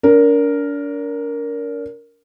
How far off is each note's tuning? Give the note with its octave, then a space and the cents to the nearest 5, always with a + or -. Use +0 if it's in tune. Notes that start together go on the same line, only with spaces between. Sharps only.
D4 -40 A#4 +0